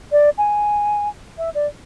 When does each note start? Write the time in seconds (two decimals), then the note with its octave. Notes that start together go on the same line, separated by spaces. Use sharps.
0.12 D5
0.38 G#5
1.38 E5
1.55 D5